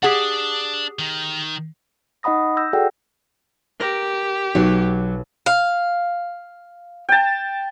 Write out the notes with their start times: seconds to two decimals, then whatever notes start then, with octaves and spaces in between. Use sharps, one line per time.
0.03 D4 G4 G#4 D5 F#5
0.99 D#3
2.23 D#4 D#5 F#5 B5 D#6 A#6
2.57 E6 G6 A#6
2.73 F#4 G#4 A4 D5 F#5 G5
3.80 G4 A#4 A#6 D7
4.55 B1 F#3 D#4
5.46 F5
7.09 G5 A5